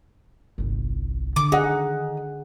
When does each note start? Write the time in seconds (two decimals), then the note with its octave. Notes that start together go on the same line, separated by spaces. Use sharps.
0.58 G1 C2
1.36 D3 D6
1.52 D#3 D#4 G#4 F#5